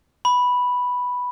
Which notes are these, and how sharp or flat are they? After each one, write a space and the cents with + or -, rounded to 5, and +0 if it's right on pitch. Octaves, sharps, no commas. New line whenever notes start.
B5 -5